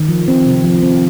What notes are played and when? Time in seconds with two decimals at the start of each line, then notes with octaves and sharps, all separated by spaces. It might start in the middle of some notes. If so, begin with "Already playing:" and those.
Already playing: D#3
0.09 F3
0.28 C4
0.46 C3
0.64 F3
0.82 C4